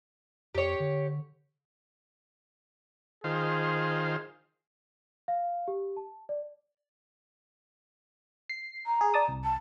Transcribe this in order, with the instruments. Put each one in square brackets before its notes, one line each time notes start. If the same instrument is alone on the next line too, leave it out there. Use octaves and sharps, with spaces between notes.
[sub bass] F2 [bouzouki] G4 C#5
[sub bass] D3
[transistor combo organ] D#3 F4 C5 [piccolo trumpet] G#4
[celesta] F5
G4
A5
D5
[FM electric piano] C7
[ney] A#5
[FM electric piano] G#4
D5 A5 D#6
C2
[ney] A5